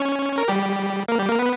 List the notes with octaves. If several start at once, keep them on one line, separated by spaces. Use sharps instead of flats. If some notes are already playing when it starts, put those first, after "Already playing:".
Already playing: C#4 C#5
A#4
G3 G4
A#3 A#4
G3 G4
A#3 A#4
B3 B4